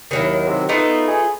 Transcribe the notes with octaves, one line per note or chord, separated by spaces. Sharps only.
D#2 D#3 F#3 E4
C3
A3 B3 D#4 F4
G#4